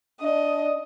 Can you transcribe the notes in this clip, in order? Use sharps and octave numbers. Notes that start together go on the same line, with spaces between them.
D4 D#5